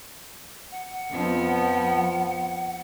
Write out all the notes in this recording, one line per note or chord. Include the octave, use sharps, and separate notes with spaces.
F#5
F2 F3 B3